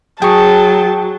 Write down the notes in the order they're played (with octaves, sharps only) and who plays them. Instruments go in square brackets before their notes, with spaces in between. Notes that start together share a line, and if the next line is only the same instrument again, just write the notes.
[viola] F#3 [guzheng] G#4 [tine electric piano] G5 C#6 [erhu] A5